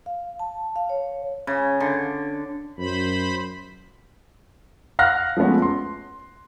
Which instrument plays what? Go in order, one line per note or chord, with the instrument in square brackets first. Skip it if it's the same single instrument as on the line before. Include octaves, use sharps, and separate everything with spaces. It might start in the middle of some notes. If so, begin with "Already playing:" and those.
[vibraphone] F5
A5
F5
C#5
[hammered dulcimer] C#3
D3
[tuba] F#2 [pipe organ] C5 B5
[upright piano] F5 F#5 F6 F#6 A#6
F3 G#3 A3 B3 C#4
C6